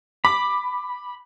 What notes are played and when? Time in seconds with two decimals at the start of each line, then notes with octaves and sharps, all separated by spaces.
0.25 B5 D6